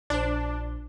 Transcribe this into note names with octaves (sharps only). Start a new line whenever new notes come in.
A#1 D4 C5